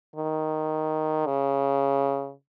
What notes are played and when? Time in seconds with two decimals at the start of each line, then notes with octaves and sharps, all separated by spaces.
0.16 D#3
1.26 C#3